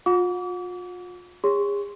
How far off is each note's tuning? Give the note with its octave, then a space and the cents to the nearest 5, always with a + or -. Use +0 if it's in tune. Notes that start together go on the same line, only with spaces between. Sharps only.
F4 +40 F#5 -30 D6 -40
G#4 -40 C#5 +0 C6 +0